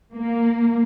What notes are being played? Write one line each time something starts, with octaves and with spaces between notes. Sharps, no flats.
A#3